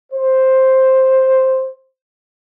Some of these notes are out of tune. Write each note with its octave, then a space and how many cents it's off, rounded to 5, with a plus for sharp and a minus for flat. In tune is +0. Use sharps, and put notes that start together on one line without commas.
C5 +5